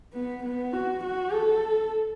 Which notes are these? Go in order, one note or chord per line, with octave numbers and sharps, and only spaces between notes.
B3
B3
F#4
F#4
A4